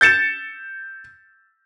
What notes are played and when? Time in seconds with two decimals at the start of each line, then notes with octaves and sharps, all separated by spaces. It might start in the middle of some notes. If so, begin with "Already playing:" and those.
0.01 G6 A6 C#7 E7